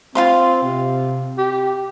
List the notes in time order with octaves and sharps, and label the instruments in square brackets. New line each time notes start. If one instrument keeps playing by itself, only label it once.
[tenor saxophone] C4 [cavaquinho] F4 F5 C6
[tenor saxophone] C3
G4